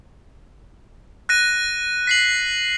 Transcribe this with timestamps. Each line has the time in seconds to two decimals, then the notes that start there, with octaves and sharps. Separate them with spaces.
1.29 F#6 A#6 D#7
2.07 B6 C7 F#7